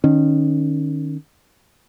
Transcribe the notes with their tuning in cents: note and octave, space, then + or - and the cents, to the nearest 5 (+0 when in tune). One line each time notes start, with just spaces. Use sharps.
D#3 -25 C#4 -5